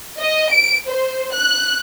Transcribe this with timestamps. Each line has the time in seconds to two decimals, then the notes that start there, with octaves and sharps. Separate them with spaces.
0.18 D#5
0.51 D7
0.88 C5
1.33 F#6